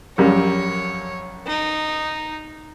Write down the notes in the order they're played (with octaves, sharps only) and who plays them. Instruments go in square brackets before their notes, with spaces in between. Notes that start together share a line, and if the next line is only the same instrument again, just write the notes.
[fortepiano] A#1 F#2 G3 [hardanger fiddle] C#5
[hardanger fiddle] D#4